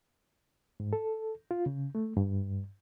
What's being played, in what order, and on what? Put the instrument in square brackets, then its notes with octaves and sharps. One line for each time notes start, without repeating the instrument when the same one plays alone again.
[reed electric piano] G#2
A4
F4
C#3
A3
G2